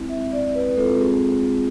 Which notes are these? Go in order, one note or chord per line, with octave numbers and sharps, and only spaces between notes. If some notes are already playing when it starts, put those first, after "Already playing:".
Already playing: G#3 C4 E4
E5
D5
B4
G#3 C4 F4 A4
G#4